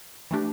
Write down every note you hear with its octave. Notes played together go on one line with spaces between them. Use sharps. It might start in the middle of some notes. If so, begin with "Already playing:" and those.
E3 A3 D4 G4